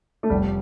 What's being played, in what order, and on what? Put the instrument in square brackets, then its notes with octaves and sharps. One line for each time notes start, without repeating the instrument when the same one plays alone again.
[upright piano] A3
[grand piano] F1 [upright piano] G3